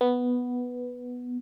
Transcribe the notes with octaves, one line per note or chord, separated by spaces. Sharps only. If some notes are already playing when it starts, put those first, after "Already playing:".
B3